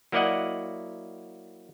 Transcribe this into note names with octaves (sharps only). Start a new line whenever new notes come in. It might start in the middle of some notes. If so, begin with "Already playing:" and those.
F#3 A#3 E4 D5 D#5 F#5